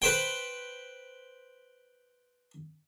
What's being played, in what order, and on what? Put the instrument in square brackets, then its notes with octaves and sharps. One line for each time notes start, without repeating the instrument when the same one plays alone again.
[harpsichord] B4 C5 G5